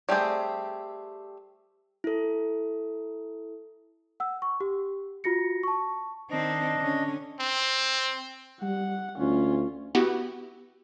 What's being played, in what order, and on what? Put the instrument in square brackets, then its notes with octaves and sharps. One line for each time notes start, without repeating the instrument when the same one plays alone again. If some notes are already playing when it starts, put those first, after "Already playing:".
[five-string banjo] G3 A3 C4 G4 G#4
[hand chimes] E4 A4
[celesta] F#5 E6
C#6
G4
F4 F#4 A#6 C#7
A5 C#6
[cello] D#3 C4 [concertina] D4 D#5
[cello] D3 C#4
[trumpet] C4
[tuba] G3 [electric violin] F#5
[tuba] D2 [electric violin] C#4 F4
[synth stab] B3 E4 F#4 G4